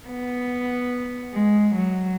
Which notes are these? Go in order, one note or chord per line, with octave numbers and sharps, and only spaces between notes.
B3
G#3
F#3